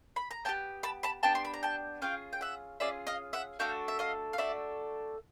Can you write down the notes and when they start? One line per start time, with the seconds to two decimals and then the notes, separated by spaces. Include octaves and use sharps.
0.16 B5
0.31 A#5
0.45 B3 D4 G4 G5 A5
0.83 A5 B5
1.03 A5 B5
1.23 B3 D4 G4 G5 A5
1.35 C6
1.45 B5
1.54 A#5
1.63 G5 A5
2.02 C#4 F4 G#4 F5 G5
2.33 G5
2.41 E5 F#5
2.80 C#4 F4 G#4 D5 E5
3.07 D#5 F5
3.33 E5 F#5
3.59 A3 D4 F#4 A4 F5 G5
3.88 E5
3.99 D#5 F5
4.33 F5
4.38 A3 D4 F#4 A4 D5 E5